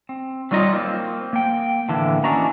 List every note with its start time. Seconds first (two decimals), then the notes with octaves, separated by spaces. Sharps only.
0.09 C4
0.51 F#3 G3 D#4 F4 D#5
0.73 A#3 C4
1.33 A#3 G5
1.89 A2 D3 E3 F3 A#3
2.24 C#4 D4 E4 F#4 D#5 A#5